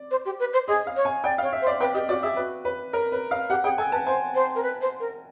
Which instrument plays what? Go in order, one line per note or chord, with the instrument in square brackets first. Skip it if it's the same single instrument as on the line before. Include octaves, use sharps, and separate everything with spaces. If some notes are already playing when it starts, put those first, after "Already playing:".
Already playing: [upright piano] D5
[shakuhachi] C5
G4
B4
C5
[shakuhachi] G#4 [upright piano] D#5
[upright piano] F5
[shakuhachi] C#5
[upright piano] G#5
[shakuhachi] D5 [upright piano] G5
[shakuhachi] C#5 [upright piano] F5
[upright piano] E5
[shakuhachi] C5
[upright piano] D5
[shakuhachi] B4 [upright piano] G5
[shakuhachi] G4 [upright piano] D#5
[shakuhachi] F#4 [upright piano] D5
[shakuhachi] G#4 [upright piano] E5
[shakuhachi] F#4 [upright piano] B4
[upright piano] B4
A#4
B4
F5
[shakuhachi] G4 [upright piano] F#5
[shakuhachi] G#4 [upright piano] G5
[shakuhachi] A4 [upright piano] G#5
[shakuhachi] B4 [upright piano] A5
[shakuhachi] C5 [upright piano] G#5
[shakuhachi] C5
A#4
B4
C5
A#4